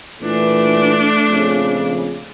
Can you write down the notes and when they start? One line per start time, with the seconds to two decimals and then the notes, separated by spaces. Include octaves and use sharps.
0.22 A#2 E3 A3 D4
1.29 A#1 F2 C#3